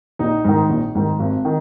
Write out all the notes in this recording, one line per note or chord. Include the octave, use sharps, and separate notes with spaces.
A#1 D#4
G#2 D#3
A#1
G#2 D#3
G#1
D#3